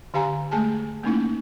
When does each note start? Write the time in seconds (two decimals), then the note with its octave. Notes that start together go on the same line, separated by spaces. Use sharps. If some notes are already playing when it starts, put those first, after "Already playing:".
0.14 D3 G4 F5 G#5 A#5
0.51 G#3 A3 G#4 G#5 A5
1.04 A3 A#3 C#4 D#4 E4